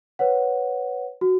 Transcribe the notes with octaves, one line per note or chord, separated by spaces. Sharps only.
B4 C#5 F#5
F#4